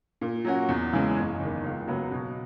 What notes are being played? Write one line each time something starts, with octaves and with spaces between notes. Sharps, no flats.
A#2
F#3 C#4 F#4
E2
C#3 E3 G#3
F#1
E2 D#3
C#2
C#3 F#3 B3
B2